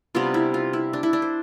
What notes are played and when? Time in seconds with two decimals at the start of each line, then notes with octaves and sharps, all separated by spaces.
0.15 C3 G3 B3 D4 F4
0.34 E4
0.54 F4
0.73 E4
0.93 D4
1.03 E4
1.13 D4
1.22 C5